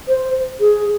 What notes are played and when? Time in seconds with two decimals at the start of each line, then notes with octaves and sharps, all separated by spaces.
0.08 C5
0.60 G#4